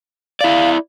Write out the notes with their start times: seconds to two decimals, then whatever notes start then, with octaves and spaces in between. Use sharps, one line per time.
0.41 E4 D5 F5